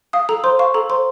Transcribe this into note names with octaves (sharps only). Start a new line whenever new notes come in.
F5 D#6
A4 A#5
C5 C6
F5 C#6
A4 A#5
C5 C6